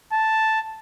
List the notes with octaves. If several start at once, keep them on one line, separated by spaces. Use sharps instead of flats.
A5